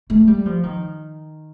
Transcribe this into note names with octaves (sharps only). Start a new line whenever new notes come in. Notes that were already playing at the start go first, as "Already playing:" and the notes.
A3
G3
F3
D#3